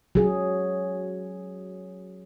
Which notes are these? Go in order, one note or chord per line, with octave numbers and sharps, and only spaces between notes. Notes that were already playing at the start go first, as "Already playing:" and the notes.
F#3 G#4